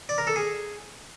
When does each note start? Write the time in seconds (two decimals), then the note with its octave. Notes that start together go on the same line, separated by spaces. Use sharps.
0.09 D5
0.18 A#4
0.27 A4
0.36 G#4